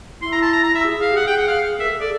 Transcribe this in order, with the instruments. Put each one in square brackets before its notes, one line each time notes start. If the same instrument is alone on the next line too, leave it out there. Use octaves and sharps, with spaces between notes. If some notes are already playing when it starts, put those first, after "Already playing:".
[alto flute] E4 [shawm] C6
[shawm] A#5
A5
A#5
A#5
E5
[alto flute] G#4
[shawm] F5
[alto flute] G4
[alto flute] G#4 [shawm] F#5
[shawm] G5
F#5
F5
[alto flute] A#4 [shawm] E5
[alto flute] A4
G#4
[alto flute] A4 [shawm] D5